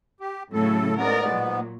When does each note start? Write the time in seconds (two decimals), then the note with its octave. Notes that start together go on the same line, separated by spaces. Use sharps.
0.20 G4
0.53 A2 C#3 F#3 A4
0.97 G#2 B3 A#4 D5
1.27 A#2 F#3